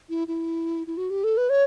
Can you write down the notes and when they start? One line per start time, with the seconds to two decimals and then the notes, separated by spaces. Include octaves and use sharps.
0.09 E4
0.28 E4
0.87 E4
0.97 F#4
1.10 G4
1.24 A4
1.37 B4
1.50 C#5